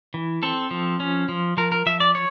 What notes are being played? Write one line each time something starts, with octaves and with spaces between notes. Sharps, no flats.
E3
C4 A4
F3
C#4
F3
F3 A#4
A#4
F3 E5
D5
C#5